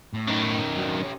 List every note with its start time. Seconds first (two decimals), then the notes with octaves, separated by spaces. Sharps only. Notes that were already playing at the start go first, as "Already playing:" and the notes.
0.13 A2
0.27 F#2 D#3
0.77 F#3 D4
1.02 C#4 G4